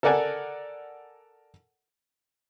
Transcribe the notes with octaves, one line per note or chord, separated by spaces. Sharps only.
A4 A#4 D5 F#5 G#5